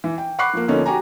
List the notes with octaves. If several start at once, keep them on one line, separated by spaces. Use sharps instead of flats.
E3
G5
F#5 B5 C#6 D6 F#6 C7
F3 A#3
D3 F3 A#3 B3 C#4 D#4
F#4 G4 G#5 A#5